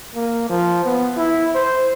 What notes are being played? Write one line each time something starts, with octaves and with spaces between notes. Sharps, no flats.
A#3
F3
B3
E4
C5